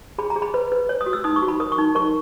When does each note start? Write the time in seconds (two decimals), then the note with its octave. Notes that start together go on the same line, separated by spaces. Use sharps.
0.18 G#4 B5
0.30 A#5
0.36 G#4
0.42 B5
0.54 B4 B5
0.72 B4
0.89 C#5
1.01 D#6
1.06 F#4
1.13 E6
1.24 D#4 D#6
1.36 C#6
1.42 F#4
1.48 B5
1.60 A#4 D#6
1.72 C#6
1.78 D#4
1.95 A#4 C#6